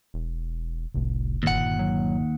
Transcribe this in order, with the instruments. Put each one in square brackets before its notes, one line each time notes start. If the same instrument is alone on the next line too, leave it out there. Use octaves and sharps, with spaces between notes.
[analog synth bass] E1
[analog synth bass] F1 [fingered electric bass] C2 A2
[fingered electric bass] G1 A#2 [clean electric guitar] D#2 F#5
[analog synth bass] F#3